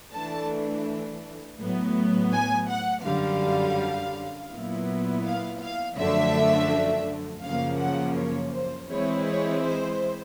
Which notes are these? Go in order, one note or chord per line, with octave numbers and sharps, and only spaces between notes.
E3 A3 D4 A5
A2 F#3 B3
G#5
F#5
F#2 D3 G3 F5
A#2 F#3 B3 E4
F5
F5
F#2 D3 F3 A3 D4 E5
F#2 C#3 F3 A#3 F5
F#5
C#5
C5
E3 G#3 C4 E4 C#5
C#5
C5